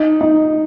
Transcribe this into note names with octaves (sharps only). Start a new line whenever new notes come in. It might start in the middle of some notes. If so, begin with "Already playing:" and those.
Already playing: D#4
D#4